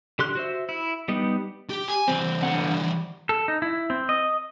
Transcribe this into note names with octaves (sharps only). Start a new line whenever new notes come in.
D3 G4 C6 F#6
F#4 C5 E5
E4
G3 B3 D#4
G4
G#5
E3 G3 C4
G2 D3 F#5
A4
D#4
E4
C4
D#5